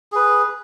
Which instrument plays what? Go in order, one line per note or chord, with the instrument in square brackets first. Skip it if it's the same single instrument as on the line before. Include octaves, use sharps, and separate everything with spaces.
[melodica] G#4 B4